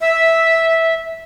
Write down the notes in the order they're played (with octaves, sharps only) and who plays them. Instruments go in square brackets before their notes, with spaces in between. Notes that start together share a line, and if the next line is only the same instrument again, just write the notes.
[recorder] E5